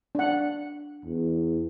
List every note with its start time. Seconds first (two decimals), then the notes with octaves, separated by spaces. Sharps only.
0.15 D4 F#5
1.05 E2